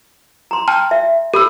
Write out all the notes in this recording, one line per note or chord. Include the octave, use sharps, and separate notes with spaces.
A#5 C6
G5 A5 F6
E5
G4 A4 B5 E6